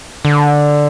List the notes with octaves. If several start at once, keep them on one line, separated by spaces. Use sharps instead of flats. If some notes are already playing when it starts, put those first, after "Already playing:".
D3